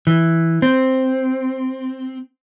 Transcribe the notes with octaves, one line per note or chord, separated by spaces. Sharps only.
E3
C4